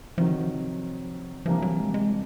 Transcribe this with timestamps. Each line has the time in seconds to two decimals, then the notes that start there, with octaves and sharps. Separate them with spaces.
0.18 C3 D#3 F3 F#3
1.46 C3 E3 F3 G3 A#3 D4
1.62 F#3
1.78 G#3
1.94 G#3
2.10 G3